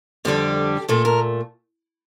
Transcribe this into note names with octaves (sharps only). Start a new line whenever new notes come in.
F2 D3 G3 G4
A#2 A3 A4
A#4